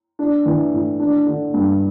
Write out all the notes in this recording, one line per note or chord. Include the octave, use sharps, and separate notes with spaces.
D4
E3
A2
D4
D3
G2